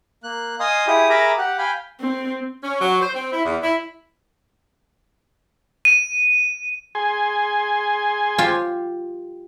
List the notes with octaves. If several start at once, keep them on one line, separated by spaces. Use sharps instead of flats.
A#3 F#6
D#5 F5 G#5 C6 D#6
E4 G4 G#4 D#6
G#4 A#4 E5 A#5 B5 D6
G4 F#5
F5 G5 G#5 B5
C4
C#4
F#3
C5
C4
E4
E2
E4
D#7
G#4 G#5 C6
F4 G4